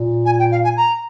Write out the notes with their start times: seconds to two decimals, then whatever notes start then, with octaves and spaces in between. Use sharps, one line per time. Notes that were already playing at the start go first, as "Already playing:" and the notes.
Already playing: A#2
0.26 G#5
0.39 G5
0.51 F5
0.64 G#5
0.77 A#5